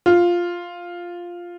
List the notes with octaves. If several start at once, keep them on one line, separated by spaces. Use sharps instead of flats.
F4